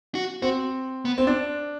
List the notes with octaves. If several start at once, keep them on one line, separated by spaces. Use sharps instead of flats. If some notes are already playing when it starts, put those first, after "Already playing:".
F#4
C4 F#4
B3
C4
D4